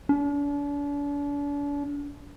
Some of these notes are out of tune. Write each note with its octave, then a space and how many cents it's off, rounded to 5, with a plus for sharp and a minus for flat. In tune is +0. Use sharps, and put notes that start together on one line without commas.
D4 -40